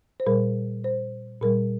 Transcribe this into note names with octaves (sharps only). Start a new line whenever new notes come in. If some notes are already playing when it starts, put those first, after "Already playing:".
C5
A#2 G3 A#4
C5
A#2 G3 A#4